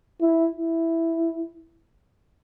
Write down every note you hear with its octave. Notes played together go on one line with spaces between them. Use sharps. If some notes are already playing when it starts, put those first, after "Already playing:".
E4
E4